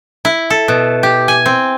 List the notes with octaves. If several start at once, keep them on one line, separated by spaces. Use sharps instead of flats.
E4
A4
B2
G4
G#5
C4